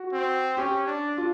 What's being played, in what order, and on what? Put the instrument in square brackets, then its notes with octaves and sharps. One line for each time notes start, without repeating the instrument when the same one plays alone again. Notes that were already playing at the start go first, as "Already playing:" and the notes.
Already playing: [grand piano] F#4
[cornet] C4
[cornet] C#4 [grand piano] G4
[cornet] D4
[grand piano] F4